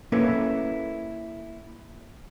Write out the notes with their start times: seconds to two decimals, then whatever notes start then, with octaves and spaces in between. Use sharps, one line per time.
0.12 A#3 C#4 E4 A4 B4 C#5